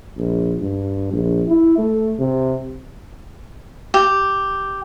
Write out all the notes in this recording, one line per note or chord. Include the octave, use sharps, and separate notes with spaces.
A#1
G2
A#1
E4
A3
C3
G4